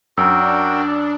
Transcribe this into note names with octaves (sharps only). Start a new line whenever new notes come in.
F#2 D4 F#4 A#4 G5 E6